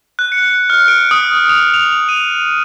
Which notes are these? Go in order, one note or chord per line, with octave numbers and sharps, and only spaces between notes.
F#6
C#7
F6
D7
D#6
F7
F7
D#7